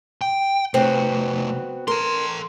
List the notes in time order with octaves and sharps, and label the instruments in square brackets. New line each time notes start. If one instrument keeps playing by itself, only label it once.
[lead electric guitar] G5
[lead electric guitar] C3 A3 [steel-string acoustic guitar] B3 C4 F#4
[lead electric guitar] A4 C6 [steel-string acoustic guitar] A#4